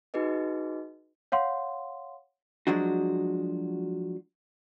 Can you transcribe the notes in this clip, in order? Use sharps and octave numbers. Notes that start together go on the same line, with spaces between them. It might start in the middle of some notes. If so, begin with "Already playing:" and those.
D#4 F#4 G#4 B4 D#5
C#5 F5 F#5 C6
F3 F#3 G#3 D4 F#4